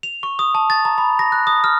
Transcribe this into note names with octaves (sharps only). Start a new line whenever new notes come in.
F7
C#6
D#6
A5
A6
A#5
B5
A#6
F#6
D#6
F6